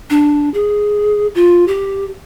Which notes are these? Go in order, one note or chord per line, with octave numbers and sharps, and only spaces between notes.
D4
G#4
F4
G4